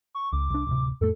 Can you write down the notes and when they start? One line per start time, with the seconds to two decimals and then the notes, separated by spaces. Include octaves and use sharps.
0.15 C#6
0.33 C#2 D6
0.50 C2 D4
0.67 D1 C3
1.01 F2 A2 A3 A4